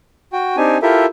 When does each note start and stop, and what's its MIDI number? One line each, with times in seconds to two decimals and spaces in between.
0.33 0.56 66
0.33 0.56 79
0.57 0.78 60
0.57 0.78 62
0.57 0.78 63
0.57 0.78 67
0.57 0.78 80
0.82 1.06 64
0.82 1.06 65
0.82 1.06 67
0.82 1.06 69
0.82 1.06 70
0.82 1.06 76